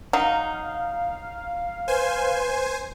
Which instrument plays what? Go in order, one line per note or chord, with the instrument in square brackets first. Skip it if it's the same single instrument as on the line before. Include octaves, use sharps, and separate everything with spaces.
[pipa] F#3 D#4 [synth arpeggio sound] F5
[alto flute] B4 [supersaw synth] C5 G#5